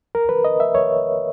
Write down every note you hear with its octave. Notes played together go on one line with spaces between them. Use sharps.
A#4
B4
D#5
E5
C#5